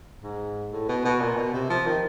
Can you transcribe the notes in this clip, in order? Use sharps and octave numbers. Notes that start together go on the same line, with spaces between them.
G#2
A2
B2
B2
A#2
B2
C3
F3
D#3